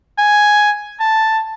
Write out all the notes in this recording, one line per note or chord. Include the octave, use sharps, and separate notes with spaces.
G#5
A5